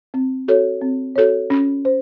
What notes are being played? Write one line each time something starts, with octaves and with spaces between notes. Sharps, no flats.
C4
F#4 A4 C#5
C4
F#4 A4 C#5
C#4
C5